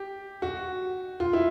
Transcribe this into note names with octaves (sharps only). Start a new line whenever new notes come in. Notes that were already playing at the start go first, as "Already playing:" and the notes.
Already playing: G4
F#4
F4
E4